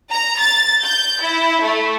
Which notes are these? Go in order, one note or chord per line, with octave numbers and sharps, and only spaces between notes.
A#5
A6
G6
E4
A3